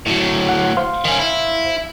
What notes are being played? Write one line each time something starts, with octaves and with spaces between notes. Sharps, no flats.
A2 F#3
F#5
C5 F5 C6
D#3 C#4
E4